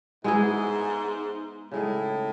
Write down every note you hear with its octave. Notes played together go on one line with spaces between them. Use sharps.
G#2 G#3 B3 E4 G#4
A2 C#3 G#3 D#4